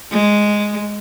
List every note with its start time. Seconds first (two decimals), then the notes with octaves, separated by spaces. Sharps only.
0.12 G#3